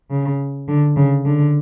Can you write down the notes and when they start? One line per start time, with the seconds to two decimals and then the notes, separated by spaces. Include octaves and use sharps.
0.10 C#3
0.69 D3
0.96 C#3
1.26 D3